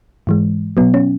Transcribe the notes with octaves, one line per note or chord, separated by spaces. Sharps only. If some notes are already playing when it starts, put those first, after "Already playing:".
G#2 E3 G#3
B2 F#3 B3
C#4